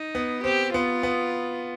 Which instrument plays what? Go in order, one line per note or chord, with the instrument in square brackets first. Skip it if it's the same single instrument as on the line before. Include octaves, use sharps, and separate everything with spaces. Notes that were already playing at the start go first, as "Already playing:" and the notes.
Already playing: [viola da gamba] D#4
[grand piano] B3
[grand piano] C4 [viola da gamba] G4
[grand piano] B3 [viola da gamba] F4
[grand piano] B3